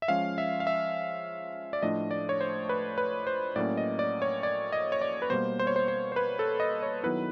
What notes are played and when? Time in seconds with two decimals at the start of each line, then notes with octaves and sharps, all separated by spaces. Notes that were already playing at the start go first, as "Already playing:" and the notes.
0.02 E5
0.08 F3 G#3 C#4 F5
0.38 E5
0.60 F5
0.67 E5
1.73 D5
1.82 A2 F3 A3 D4 F4 D#5
2.11 D5
2.29 C#5
2.41 C5
2.69 B4
2.98 B4
3.27 C5
3.56 A2 F#3 A#3 C#4 D5
3.77 D#5
3.99 D5
4.22 C#5
4.43 D5
4.72 D#5
4.92 C#5
5.01 D5
5.22 B4
5.30 B2 G3 A#3 C5
5.59 C5
5.67 C#5
5.76 C5
5.88 C5
6.12 C5
6.16 B4
6.39 A4
6.60 D#5
6.83 C#5
7.03 D#3 F#3 B3 E4 B4